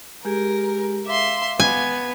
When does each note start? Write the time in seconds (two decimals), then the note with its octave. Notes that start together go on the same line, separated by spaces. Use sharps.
0.25 G#3 G4 G#4 A#4
1.06 E5 F5 C6 D6
1.60 B3 G#5